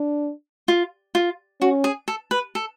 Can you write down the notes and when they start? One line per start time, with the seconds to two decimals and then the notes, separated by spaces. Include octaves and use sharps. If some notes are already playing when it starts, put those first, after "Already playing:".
Already playing: D4
0.68 F4
1.15 F4
1.61 C#4 F#4
1.84 G#4
2.08 A4
2.31 B4
2.55 A4